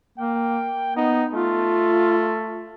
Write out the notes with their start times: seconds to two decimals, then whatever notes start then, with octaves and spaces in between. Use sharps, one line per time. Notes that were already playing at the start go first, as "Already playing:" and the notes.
0.18 A#3 G5
0.96 B3 D#4
1.34 A3 F4